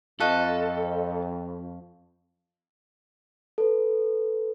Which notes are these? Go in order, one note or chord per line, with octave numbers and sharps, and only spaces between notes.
F2 A4 D#5 F5 A5 C#6 F#6
A4 B4